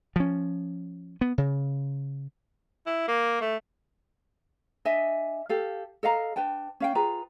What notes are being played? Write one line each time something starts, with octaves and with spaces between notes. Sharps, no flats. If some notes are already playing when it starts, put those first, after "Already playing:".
F3 C#4
B3
C#3
E4
A#3
A3
D4 D#5 E5 G#5
G4 A4 F5
A4 D#5 F5 A#5
D4 B4 G5 A5
C#4 F5 G5
F4 G#4 B4 A#5